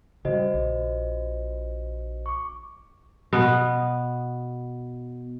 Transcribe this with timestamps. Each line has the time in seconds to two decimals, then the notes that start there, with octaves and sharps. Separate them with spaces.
0.25 C#3 F#3 G3 F#4 C5 D#5
0.54 A#1
2.26 C#6 D6
3.33 B2 B3